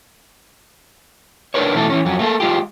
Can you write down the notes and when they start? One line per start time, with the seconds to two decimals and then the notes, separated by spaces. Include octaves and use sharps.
1.54 D4 D#4 A#4 B4 C#5
1.75 B2 E3 A3 A4
1.90 E3 C#4
2.05 F2 F#3
2.19 A3 A#3 G4 A4
2.40 G#3 F4 G4